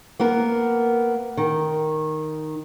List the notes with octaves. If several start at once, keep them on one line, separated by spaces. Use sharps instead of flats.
A#3 B3 A#4
D#3